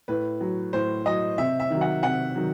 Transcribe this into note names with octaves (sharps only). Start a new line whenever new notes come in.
A2 B4
F#3
A2 C5
F#3 D#5
C3 E5
E5
D#3 F#3
F#5
C3 F#5
D#3 F#3